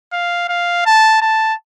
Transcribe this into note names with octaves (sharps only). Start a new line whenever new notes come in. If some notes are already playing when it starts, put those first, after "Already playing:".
F5
F5
A5
A5